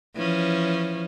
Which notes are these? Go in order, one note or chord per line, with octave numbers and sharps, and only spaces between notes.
E3 F3 C#4